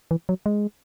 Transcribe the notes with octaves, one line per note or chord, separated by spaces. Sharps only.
E3
F#3
G#3